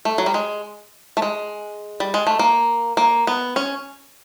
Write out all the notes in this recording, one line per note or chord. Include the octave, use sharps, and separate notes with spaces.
A3
F#3
G3
G#3
A3
G#3
G3
G#3
A3
A#3
A#3
B3
C#4